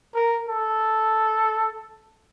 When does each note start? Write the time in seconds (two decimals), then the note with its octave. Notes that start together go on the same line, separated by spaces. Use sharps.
0.15 A#4
0.49 A4